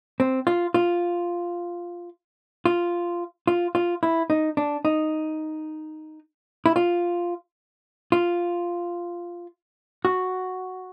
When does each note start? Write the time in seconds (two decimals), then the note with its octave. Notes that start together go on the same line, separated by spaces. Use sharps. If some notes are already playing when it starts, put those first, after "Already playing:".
0.20 C4
0.47 F4
0.74 F4
2.66 F4
3.47 F4
3.75 F4
4.03 E4
4.30 D#4
4.57 D4
4.85 D#4
6.66 E4
6.76 F4
8.12 F4
10.05 F#4